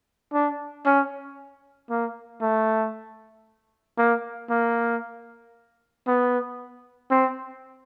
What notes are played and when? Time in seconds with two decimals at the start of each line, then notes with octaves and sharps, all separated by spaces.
0.33 D4
0.86 C#4
1.90 A#3
2.41 A3
3.98 A#3
4.50 A#3
6.07 B3
7.11 C4